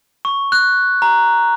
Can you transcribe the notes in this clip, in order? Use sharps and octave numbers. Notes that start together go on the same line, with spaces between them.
C#6
F#6
A#5